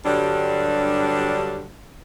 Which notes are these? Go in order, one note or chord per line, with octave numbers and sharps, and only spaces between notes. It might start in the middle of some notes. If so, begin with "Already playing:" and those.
G2 D3 F#3 G3 D4